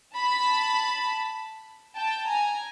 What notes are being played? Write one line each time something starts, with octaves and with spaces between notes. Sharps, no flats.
A5 B5
G5 A5
G#5 A#5